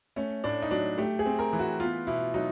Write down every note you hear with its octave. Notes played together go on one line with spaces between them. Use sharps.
A3 C#4
A2 D4
D#4
F#3 D4
A3 G4
G#4
C4
A#4
E3
F#4
B3 F4
B2 E4
F#3 D#4